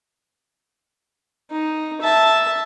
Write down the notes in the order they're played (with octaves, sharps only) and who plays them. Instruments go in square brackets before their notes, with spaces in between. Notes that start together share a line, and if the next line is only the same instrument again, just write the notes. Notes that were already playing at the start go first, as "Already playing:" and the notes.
[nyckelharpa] D#4
E5 A5